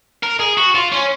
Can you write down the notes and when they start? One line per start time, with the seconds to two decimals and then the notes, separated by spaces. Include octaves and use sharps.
0.23 A#4
0.40 G#4
0.57 F#4
0.75 F4
0.92 C#4